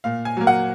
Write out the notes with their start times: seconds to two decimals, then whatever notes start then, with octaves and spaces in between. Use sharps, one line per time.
0.04 A#2 F5
0.25 G#5
0.37 F#3 A#3
0.47 F#5